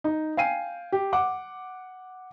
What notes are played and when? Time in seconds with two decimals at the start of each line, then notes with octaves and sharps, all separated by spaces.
0.04 D#4
0.37 F5 G5 G#5 C7 D#7
0.92 G4
1.13 F#5 D6